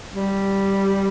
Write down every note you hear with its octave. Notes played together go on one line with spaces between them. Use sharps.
G3